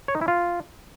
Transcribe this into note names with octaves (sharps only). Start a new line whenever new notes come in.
C#5
D#4
E4
F4